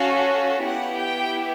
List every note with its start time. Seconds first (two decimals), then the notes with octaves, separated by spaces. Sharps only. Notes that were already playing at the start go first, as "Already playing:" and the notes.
Already playing: C#4 F#4 A4 F5
0.64 B3 E4 G4 F#5
0.99 G5